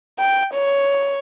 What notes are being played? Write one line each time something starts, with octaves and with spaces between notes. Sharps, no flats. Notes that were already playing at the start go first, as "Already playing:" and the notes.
G5
C#5